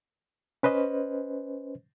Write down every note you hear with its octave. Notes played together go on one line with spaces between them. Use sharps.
C#4 B4 C5 D#5